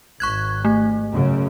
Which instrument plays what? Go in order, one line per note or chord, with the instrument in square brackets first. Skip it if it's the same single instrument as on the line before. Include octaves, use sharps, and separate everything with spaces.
[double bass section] G#1 [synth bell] C#6 F#6 G#6
[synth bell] A3
[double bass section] F#2 C#3